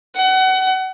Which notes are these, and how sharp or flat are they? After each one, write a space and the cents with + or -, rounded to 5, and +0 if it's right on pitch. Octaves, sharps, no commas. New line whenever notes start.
F#5 +30